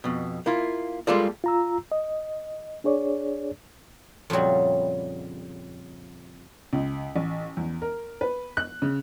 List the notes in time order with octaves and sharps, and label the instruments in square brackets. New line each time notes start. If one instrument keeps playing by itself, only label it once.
[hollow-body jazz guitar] F2 B2
A#3 E4 F4
G3 G#3 A#3 F4 A4 D5
[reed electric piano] F4 A#5 E6
D#5
D4 G#4 C#5 D5
[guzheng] F2 A#2 C#3 F#3 G3
[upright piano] C#2
A1
E2
A#4
B4
F#6
C#3